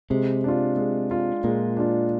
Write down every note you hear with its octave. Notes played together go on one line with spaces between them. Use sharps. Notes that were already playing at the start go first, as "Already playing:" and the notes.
C3 G#3
D4 F4
G#3
D4 F4
A#2 G#3
D4 F4